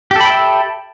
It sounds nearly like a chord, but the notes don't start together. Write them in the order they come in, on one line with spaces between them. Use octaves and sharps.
G4 A4 B5 G5 E5